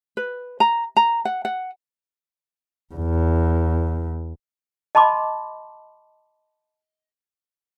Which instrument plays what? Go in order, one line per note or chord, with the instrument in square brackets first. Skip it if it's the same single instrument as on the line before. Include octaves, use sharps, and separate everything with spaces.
[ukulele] B4
A#5
A#5
F#5
F#5
[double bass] E2
[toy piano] D#5 A5 B5 C6 D6